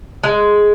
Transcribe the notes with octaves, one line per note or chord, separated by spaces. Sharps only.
G#3